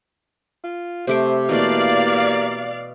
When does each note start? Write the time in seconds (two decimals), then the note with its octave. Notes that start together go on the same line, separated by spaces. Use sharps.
0.64 F4
1.07 C3 A3 G4 C5 D6
1.49 B2 E3 A3 A#3 D5 F5